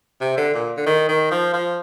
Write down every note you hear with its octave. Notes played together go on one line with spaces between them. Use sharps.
C3
D3
A#2
D3
D#3
D#3
F3
F3